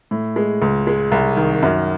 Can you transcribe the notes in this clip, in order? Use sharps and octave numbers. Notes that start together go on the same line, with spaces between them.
A2
G#3
C#2
G#3
C2
D#3
F#2